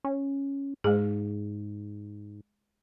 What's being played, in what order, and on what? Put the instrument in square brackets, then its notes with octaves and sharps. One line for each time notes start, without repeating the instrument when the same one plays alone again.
[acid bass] C#4
[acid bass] G#2 [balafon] G#3 G#4